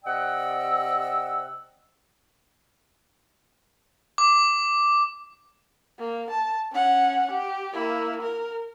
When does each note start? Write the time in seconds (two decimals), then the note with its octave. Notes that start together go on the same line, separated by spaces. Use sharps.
0.04 C3 D5 D#5 F#5 G5 E6
4.18 D6
5.99 A#3
6.30 A5
6.72 C#4 F#5
7.30 G4
7.73 A#3 E4
8.22 A#4